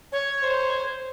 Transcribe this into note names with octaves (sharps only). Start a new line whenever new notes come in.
C#5
C5